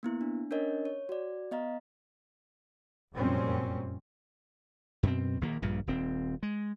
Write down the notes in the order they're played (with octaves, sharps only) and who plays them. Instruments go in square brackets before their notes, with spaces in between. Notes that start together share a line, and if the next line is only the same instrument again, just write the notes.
[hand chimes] A#3 B3 E4
D4
C#4 D4 A#4 C#5 D#5
C#5
F#4 D5
B3 D#5 F5 A#5
[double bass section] F1 F#2 A#2 G3 C4 C#4
[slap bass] F#2 B2 C4
A#1 D#3 A#3
A#1 G2 A#2
D#1 C4
G#3